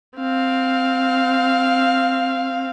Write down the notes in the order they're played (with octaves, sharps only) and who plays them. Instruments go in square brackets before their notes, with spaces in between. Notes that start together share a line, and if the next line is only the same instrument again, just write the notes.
[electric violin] C4 F5